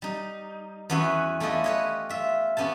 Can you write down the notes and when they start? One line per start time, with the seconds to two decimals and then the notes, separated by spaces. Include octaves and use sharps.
0.02 G3 D#4
0.90 E2 B3 C#4 F#4 E5
1.40 A3 E4 F4 G4 D#5
1.64 B4 C#5 D#5
2.09 F4 E5
2.57 B3 C#4 G4 A5